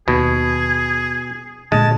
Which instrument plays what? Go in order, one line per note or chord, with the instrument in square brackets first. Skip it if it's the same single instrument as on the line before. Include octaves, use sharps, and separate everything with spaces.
[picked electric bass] D#2 [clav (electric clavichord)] B2 [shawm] G#4
[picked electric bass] A#2 D3 [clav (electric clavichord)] G#3 [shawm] A5